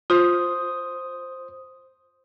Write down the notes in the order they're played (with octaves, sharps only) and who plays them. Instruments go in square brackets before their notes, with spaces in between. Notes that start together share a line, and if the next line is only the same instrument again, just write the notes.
[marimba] F4 [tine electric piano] C5 D#6